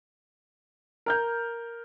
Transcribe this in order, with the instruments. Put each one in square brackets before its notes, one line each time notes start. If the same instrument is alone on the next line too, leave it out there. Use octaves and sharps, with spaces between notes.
[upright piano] A#4 F6 G6